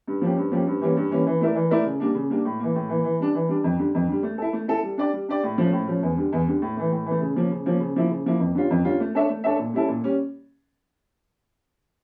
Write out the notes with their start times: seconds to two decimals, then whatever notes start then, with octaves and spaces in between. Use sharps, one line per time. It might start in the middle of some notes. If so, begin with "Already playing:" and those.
0.08 G2
0.21 F3 A#3 C#4 G4
0.37 G2
0.52 F3 A#3 C#4 G4
0.67 G2
0.81 E3 G3 A#3 C#4
0.97 G2
1.11 E3 G3 A#3 C#4
1.27 E3
1.41 A3 E4 A#4 D5
1.55 E3
1.70 A3 E4 A#4 D5
1.86 C#3
2.00 G3 A#3 D4
2.15 C#3
2.30 G3 A#3 D4
2.45 A2
2.59 E3 A#3
2.76 A2
2.89 E3 A#3
3.04 E3
3.20 G3 D4
3.35 E3
3.49 G3 D4
3.64 F2
3.79 D3 G3
3.95 F2
4.08 D3 G3
4.23 A3
4.38 E4 A4
4.53 A3
4.68 E4 A4
4.83 G3
4.98 D4 G4 D5
5.13 G3
5.28 D4 G4 D5
5.43 A2
5.58 F3 A3 C#4
5.73 A2
5.87 F3 A3 C#4
6.03 E2
6.17 D3 G3
6.33 E2
6.47 D3 G3
6.62 A2
6.77 E3 A3
6.92 A2
7.06 E3 A3
7.21 C#3
7.36 F3 A#3 C#4
7.51 C#3
7.66 F3 A#3 C#4
7.80 C#3
7.96 F3 A#3 E4
8.10 C#3
8.26 F3 A#3 E4
8.40 F2
8.55 D3 G3 C#4 F4
8.70 F2
8.85 D3 G3 C#4 F4
9.00 A3
9.15 D4 A4 C#5 E5
9.29 A3
9.44 D4 A4 C#5 E5
9.59 A#2
9.74 G3 C#4 E4 A4
9.89 A#2
10.04 G3 C#4